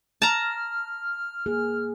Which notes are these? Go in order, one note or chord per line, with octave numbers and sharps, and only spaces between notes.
A5 A#5 F6
A#3 G#4